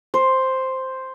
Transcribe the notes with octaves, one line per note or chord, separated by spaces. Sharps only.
C5